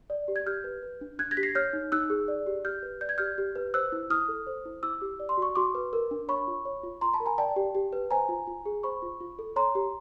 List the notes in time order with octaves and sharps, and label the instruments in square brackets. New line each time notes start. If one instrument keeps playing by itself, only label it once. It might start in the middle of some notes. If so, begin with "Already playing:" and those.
[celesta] D5
G4
G#6
G4 F6 G6
B4
B4
D4
D4 F#6 G#6
G#6 A#6
G4 B6
A#6 C7
C#5 F6 G6
D#4
D#4 E6 F#6
G#4
D5
G4
G4 F6 G6
B4
D5 G6
G#6
G4 F6 G6
G4
B4
C5 E6 F#6
E4
E4 D#6 F6
A4
C5
E4
E4 D6 E6
G4
D5
C6
F#4 C#6
F#4 C6 D6
B4
A#4
D4
C#5 B5 C#6
F4
C#5
F4
F4 A#5 C6
A5 B5
A#4
G#5 A#5
D5 G5 A5
G4
G4
B4
C5 G#5 A#5
F4
F4
G#4
C5 B5 C#6
F4
F4
A4
C#5 A#5 C6
G4